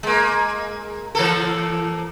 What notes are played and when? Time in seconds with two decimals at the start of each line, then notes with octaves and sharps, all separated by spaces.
0.03 G#3 A#3
1.15 E3 A#3 A4